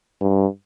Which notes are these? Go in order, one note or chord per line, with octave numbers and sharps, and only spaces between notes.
G2